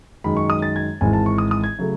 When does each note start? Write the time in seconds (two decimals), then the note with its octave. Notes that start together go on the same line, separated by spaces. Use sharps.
0.24 F#2 D#3 G#3 B5
0.37 C#6
0.50 D#6
0.62 A6
0.76 G#6
1.01 G#1 G#2 E3 G#5
1.13 A5
1.26 C#6
1.38 D#6
1.51 D#6
1.64 G#6
1.79 C#3 F#3 A3